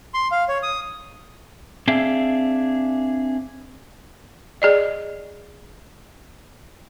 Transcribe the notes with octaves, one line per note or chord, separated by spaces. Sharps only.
C6
F5
C#5
D#6
C4 D4 G#4 E5 F5
G#4 D5 D#5